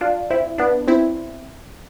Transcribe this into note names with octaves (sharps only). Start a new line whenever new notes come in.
D4 F4
C4 E4
B3 D4
C4 E4